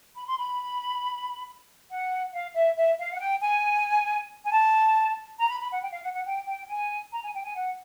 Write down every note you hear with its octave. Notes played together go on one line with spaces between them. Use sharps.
B5
C6
B5
F#5
F5
E5
E5
F5
F#5
G5
G#5
G#5
A5
A#5
B5
B5
F#5
G5
F5
F#5
F#5
G5
G5
G#5
A#5
G#5
G5
G#5
F#5